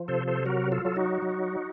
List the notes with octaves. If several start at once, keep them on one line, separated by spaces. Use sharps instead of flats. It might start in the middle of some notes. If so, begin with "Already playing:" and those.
Already playing: F3
C3 A4 C5
A4 C5
F#3 F#4 A#4
F4 A4
F#3 A4
D#4 F#4
F#3